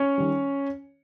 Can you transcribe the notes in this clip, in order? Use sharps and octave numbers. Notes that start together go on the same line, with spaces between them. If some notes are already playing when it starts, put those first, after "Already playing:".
Already playing: C#4 C#5
D#3 G3